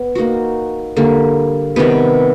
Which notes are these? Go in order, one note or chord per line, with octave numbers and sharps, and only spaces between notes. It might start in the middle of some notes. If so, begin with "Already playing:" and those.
Already playing: B3
A#3 D#4 F#4
D3 G3 A#3
C3 D#3 G3 B3